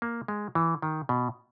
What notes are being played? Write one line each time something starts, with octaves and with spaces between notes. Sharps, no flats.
A#3
G#3
E3
D#3
B2